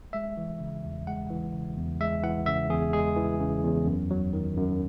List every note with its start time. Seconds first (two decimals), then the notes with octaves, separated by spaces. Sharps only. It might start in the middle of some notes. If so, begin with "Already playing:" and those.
0.13 G#3 E5
0.37 E3
0.60 C#3
0.84 E2
1.07 G#3 F#5
1.30 E3
1.54 C#3
1.77 E2
2.00 G#3 E5
2.23 E3 F#5
2.46 C#3 E5
2.70 E2 G#4
2.93 G#3 G#4
3.16 E3
3.39 C#3
3.64 E2
3.87 F#2
4.11 F#3
4.33 D#3
4.57 F#2